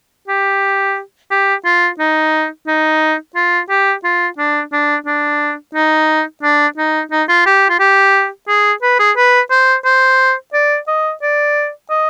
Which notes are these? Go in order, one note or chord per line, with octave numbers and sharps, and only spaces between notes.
G4
G4
F4
D#4
D#4
F4
G4
F4
D4
D4
D4
D#4
D4
D#4
D#4
F4
G4
F4
G4
G#4
B4
G#4
B4
C5
C5
D5
D#5
D5
D#5